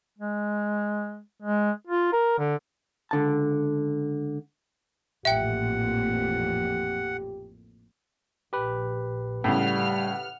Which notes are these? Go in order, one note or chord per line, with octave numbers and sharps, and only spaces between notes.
G#3
G#3
F4
A#4
D3
C#2 D3 A5
A1 F2 A#2 G4 E5 F#5 G5
A#1 G4 B4
A2 C#3 G3 F#5 F6